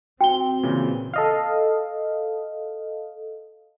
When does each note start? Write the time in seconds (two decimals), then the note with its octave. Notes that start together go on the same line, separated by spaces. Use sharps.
0.21 C4 F#4 G5 G7
0.63 A#2 C#3 E3
1.14 A4 D#5 F5